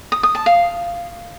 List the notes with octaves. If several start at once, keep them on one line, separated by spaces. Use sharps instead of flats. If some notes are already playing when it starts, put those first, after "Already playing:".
D#6
D#6
A5
F5